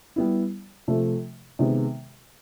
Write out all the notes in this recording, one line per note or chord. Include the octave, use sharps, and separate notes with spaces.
G3 B3 E4
C3 F3 A3
C3 D#3 G#3 B3